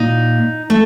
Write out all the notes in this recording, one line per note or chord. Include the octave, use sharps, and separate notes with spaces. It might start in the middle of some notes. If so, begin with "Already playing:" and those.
Already playing: A#2 D#4
A3